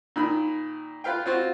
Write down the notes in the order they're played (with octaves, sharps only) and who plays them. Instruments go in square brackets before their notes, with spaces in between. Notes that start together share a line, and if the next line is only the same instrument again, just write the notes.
[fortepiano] A#2 D#3 B5
F4 B4 F5 G5
C4 F4 F#4